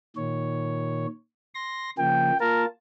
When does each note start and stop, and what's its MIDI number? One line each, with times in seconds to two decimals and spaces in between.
0.16 1.06 46
0.16 1.06 51
0.16 1.06 73
1.55 1.90 84
1.55 1.90 94
1.99 2.32 49
1.99 2.32 53
1.99 2.32 58
1.99 2.36 79
2.40 2.66 58
2.40 2.66 65
2.40 2.65 70
2.40 2.66 81